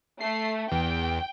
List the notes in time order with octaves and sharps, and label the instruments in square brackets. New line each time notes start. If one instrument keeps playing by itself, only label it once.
[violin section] A3 [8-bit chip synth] C7
[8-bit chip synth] E2 [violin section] G5